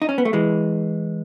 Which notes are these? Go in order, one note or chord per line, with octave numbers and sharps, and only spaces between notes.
D#4
C#4
B3
A3
E3 G#3